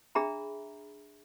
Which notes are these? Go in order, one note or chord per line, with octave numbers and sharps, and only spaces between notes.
D4 G#4 E5 A#5 B5